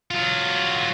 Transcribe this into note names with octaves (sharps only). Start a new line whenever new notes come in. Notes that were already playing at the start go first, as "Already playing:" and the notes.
F#3 F4